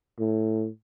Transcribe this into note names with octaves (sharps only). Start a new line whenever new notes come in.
A2